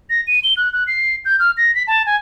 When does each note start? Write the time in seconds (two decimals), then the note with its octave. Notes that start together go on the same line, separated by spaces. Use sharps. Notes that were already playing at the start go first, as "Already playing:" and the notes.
0.10 A#6
0.27 D#7
0.44 G7
0.57 F#6
0.73 F#6
0.87 C7
1.25 G6
1.39 F6
1.57 A#6
1.75 B6
1.87 A5
2.06 G#5